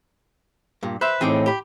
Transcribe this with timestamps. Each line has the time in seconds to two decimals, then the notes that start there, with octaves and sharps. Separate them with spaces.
0.83 G2 A#2
1.01 B4 C5 E5
1.21 A2 E3 C4 D#4 G#4 G5 D6
1.46 G4 B5